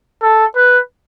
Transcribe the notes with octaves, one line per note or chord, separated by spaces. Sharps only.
A4
B4